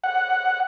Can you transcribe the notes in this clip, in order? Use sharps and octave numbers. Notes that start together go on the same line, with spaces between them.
F#5